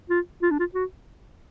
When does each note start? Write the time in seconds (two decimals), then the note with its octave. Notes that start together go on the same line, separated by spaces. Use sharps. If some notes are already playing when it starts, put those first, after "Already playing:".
0.10 F4
0.42 F4
0.51 D4
0.59 F4
0.74 F#4